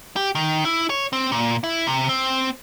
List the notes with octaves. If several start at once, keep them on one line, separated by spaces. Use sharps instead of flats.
G4
D#3
E4
C#5
C4
A#2
E4
C3
C4